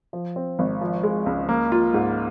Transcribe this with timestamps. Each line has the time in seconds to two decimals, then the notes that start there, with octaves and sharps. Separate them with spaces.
0.13 F3
0.36 C4
0.59 G#1
0.81 F3
1.03 G#3
1.26 C#2
1.49 A#3
1.72 F4
1.94 G#2